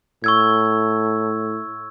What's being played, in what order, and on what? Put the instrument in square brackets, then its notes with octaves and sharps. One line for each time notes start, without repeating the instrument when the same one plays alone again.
[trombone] A2 [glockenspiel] C#6 E6 G#6